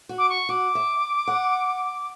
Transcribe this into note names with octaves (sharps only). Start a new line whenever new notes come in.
F#4
D6
C#6
F#4 D6
E5
F#5